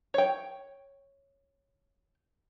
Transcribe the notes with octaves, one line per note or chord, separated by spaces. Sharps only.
C#5 G5